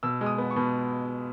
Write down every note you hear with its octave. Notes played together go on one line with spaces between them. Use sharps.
B2 E6
G#3
D#6
B3
C#6
B2